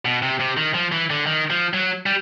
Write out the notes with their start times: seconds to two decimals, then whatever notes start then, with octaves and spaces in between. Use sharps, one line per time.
0.05 B2
0.22 C3
0.40 C3
0.57 D#3
0.74 F3
0.92 E3
1.10 D3
1.26 D#3
1.50 F3
1.73 F#3
2.06 G3